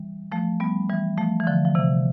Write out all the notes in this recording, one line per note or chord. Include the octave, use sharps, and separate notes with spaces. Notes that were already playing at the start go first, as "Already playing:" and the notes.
Already playing: E3 G3
F3 A3
G3 B3
E3 G3
F3 A3
E3
D3 F3
F3
C3 E3